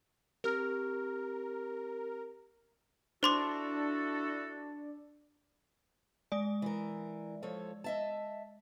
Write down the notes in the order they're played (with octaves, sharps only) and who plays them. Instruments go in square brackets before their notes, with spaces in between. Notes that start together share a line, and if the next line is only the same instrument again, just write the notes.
[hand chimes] C4 G4 F6 [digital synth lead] A#4
[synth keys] D4 [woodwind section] E4 F#4 A4 [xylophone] C5 C6 D6
[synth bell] G#3 D5
[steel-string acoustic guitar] E3 A#4
F3 A4 C#5
D#5 E5 A5